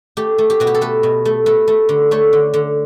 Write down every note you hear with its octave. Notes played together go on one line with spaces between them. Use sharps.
A3 G4
A3
G4
B2 F#4
G4
A4
A3 B4
B2
A3
A3 B4
A3
D3
A3 C#5
D3
D3